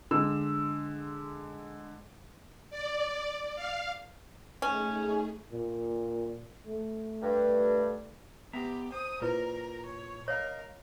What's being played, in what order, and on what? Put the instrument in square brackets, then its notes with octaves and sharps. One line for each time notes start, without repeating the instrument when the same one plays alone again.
[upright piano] D3 G#3 E6
[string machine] D5
F5
[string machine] A3 D#4 G#4 [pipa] C#4
[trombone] A#2
A3
[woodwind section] G2
[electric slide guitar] B3 E5 A#5 [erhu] G4
[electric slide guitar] C5 [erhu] D#6
[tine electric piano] A#2 [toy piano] E4 B4 D6 [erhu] A#4
[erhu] C#5
[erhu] A#4 [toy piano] C#5 [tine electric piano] D#5 F5